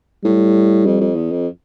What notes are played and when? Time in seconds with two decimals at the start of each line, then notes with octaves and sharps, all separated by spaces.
0.24 A2 G3
0.85 F2
1.00 F2
1.15 E2
1.31 F2